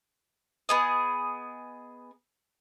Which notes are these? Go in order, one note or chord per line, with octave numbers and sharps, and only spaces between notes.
B3 G#4 D#5